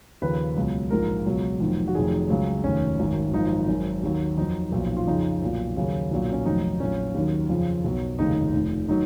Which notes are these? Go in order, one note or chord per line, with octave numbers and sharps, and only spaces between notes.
D#2 C#3 F3 B4
C#2 B2 F#3
A#1 G#2 F3 A#4
C#2 B2 F#3
F1 F2 D#3 F#3
F#4
F1 F2 D#3 F#3 G#4
C#2 C#3 F#3
F1 D#2 D#3 C#4
G#1 F#2 D#3 F#3
G#1 F#2 F3 D#4
G#1 F#2 D#3
D#2 D#3 F#3
F2 D#3 F#3 D#4
B1 A#2 F3
F4
F2 C#3 F3 D#4
B1 A#2 F3
D#2 C#3 F#3
B1 A#2 F#3
C#4
F1 F2 D#3 F#3 D#4
A#1 A#2 F#3 C#4
D#2 D#3 F#3
F2 C#3 F3
B1 B2 F#3
F1 D#2 C#3 D#4
F1 F2 D#3
D#3 F#3 D#4